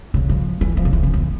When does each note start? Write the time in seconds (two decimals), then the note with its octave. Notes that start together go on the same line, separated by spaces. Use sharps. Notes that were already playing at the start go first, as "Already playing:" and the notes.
0.14 C#3
0.29 F3
0.61 E3
0.77 F3
0.85 C#3
0.93 E3
1.03 C#3
1.14 E2